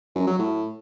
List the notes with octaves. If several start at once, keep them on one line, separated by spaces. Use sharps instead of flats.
F#2
F#3
A2